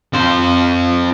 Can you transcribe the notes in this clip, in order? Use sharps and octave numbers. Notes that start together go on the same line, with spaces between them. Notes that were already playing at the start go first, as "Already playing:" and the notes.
F2 C5